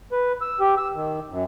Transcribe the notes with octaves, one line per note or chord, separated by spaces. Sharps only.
B4
E6
G4
E6
D#3
F#2